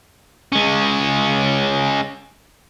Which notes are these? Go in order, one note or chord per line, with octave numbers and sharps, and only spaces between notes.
G#3 C#4